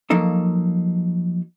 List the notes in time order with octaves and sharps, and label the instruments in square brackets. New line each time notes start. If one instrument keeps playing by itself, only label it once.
[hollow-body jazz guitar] F3 F#3 A#3 D#4 A4